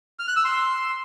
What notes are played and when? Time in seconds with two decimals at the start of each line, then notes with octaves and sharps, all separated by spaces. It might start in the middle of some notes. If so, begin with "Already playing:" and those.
0.19 F6
0.28 F#6
0.36 E6
0.45 C6